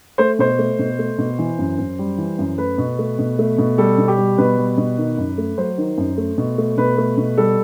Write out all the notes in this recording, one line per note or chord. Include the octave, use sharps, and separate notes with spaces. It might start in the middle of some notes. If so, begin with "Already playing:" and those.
A3 C5
B2 C5
A3
B2
A3
B2
E3
F#2
F#2
G3
E3
F#2
A3 B4
B2
A3
B2
A3
B2
G3 A4
B2
G4
G3
B2 B4
G3
B2
D#3
F#2
A3
F#3 C5
D#3
F#2
A3
B2
A3
B2 B4
A3
B2
G3 A4